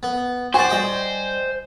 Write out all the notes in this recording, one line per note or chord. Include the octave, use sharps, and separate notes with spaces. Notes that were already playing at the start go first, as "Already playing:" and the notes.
B3
F#4 C5 D5 G#5
G3 D#5 G5